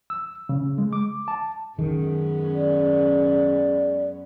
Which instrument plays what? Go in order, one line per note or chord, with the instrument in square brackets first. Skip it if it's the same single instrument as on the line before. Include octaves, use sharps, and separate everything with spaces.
[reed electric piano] E6
C#3
G#3
D6
A5
[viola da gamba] F#2 B3 C#4 [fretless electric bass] D#3 [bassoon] G#3
[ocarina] D5